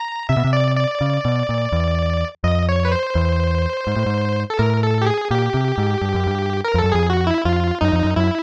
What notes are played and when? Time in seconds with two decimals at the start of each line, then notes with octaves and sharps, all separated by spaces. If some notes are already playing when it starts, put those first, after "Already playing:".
Already playing: A#5
0.29 C3 E5
0.37 B2
0.45 C3
0.53 D5
0.76 D5
1.01 C#3
1.25 B2
1.49 A#2
1.72 E2
2.44 F2 D#5
2.69 C#5
2.85 B4
2.92 C5
3.15 E2
3.87 G#2
3.96 A2
4.06 G#2
4.50 A4
4.59 A2 A#4
4.83 A4
5.01 G4
5.07 G#4
5.31 A#2 G4
5.54 C3
5.78 G#2
6.02 G2
6.14 F#2
6.27 G2
6.65 A#4
6.74 F2
6.78 F#2 A4
6.92 F2 G#4
7.10 F#4
7.27 E4
7.45 F2 F4
7.81 F#2 D#4
7.93 F2
8.04 F#2
8.16 F#2 E4